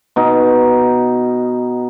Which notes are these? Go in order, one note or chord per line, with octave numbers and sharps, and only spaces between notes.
B2 D#4